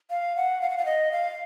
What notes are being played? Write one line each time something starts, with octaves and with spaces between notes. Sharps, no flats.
F5
F#5
F5
F#5
F5
D#5
F5